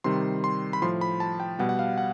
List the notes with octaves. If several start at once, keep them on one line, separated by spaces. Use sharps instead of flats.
C3 D#3 G3 C6
C6
B5
A2 F3 C6
B5
A5
G5
B2 G3 F#5
F#5
F5
F#5